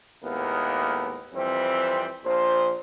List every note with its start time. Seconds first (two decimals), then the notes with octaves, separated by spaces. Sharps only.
0.23 D#2 A2 G#3 A#3 B3
1.34 F2 E3 G3 C4
2.24 A#1 A#2 F3 C5